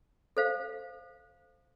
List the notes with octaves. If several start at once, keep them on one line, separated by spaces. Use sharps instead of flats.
A4 C5 F5